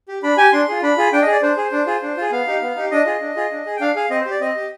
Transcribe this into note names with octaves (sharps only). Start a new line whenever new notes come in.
G4
D4 B5
G4 G#5
D4 C6
F4 G#4
D4 B5
F4 G#4
D4 G5
D#5
G#4 D5
D4 C5
G#4
D4
F4 G#4
D4
F4 G#4
B3 F5
D#4 G4
B3
D#4 G4
D4 D#5
F4 G#4
D4
F4 G#4
D4
G#4
G5
D4 F5
G#4 F5
C4 D#5
C5
G4
D5
C4 D#5
G4